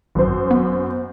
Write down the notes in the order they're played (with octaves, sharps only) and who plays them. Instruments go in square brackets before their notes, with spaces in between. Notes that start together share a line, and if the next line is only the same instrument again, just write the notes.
[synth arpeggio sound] G#1 [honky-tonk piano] F#2 C5
[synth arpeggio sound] B3